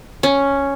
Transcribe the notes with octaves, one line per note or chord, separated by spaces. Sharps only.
C#4